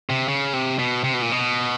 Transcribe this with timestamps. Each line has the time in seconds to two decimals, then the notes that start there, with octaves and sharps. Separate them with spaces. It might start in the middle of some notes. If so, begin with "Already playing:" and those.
0.10 C3
0.28 C#3
0.53 C3
0.79 B2
1.04 C3
1.13 B2
1.22 A#2
1.32 B2